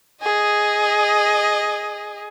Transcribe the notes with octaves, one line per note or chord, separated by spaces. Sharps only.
G#4 D#5